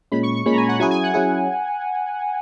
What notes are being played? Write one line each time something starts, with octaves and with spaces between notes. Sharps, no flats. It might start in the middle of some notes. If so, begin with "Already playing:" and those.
A#2 G#3 C#4 B5
C#6
C#6
A#2 G#3 C#4 B5
A#5
G#5
F#5
F#3 C#4 E4 G#4 G#5
G#5
F#5
F#3 C#4 E4 G#4